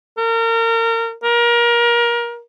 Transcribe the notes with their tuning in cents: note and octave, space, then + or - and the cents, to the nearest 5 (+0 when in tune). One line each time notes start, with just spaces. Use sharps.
A#4 -30
A#4 +25